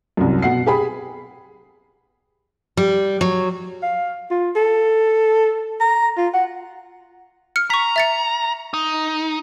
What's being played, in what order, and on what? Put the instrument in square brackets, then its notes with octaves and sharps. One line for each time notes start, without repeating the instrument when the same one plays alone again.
[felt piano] C2 F#2
B2 F#5 C7
G4 G#4 B5
[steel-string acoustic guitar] G3
F#3
[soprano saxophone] F5
F4
A4
A#5
F4
F#5
[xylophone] F6 C#7
[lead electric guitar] A#5 [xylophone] C#6 B6
[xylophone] E5 A6 C#7
[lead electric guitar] D#4